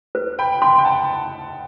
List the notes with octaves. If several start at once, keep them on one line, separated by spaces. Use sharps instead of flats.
B4
G5 B5
G5 B5 C6
G5
F#5 A5